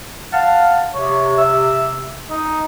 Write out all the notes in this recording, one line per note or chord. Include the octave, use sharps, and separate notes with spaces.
F5 F#5 A5
C3 C#5
E5
D#4